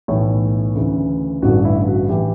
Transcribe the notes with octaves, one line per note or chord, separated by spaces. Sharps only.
B1 A2 E3 C#5
D2 C#3 E3
A1 G2 D3 F#4
E4
F#4
A2 E3 G4